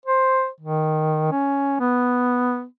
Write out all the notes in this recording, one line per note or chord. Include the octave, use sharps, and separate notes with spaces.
C5
D#3
C#4
B3